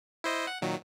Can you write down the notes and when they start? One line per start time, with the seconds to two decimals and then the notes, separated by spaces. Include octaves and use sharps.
0.24 E4 C5 D#5
0.47 F#5
0.62 A#2 D#3 F#3